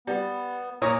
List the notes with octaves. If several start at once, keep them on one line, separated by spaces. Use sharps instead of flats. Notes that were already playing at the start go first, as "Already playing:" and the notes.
G3 B3
A#2 C#5 A#5 D#6